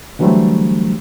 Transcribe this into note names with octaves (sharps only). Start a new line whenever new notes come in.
D3 E3 F#3 G3 A3 C4